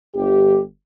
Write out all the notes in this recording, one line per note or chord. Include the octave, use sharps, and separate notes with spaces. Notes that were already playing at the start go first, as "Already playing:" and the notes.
G1 G4